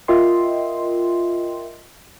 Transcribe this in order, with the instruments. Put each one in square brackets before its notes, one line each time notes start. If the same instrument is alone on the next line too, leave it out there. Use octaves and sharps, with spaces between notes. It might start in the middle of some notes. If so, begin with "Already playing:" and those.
[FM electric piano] F4 A#4 D#5 E5 G5 C6